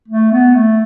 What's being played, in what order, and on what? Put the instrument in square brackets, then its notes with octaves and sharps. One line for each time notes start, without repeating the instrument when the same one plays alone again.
[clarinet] A3
B3
A3